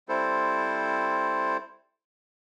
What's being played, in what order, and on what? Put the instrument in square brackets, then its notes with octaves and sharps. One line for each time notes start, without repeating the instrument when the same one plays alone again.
[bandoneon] G3 C4 E4 A4 C5